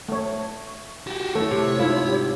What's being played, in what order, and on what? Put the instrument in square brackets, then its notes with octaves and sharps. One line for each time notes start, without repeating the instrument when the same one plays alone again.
[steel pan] A3 C#5
[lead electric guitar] F#4 G4
[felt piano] A3 E4 [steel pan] A4 [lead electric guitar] C#5
[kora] C3
[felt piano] G#2 [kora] E4 [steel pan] F4
[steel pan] G4